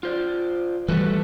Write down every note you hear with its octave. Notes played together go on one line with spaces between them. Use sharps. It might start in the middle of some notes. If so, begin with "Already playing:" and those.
F4 C5 D5
E3 G3 A3 F#4 B4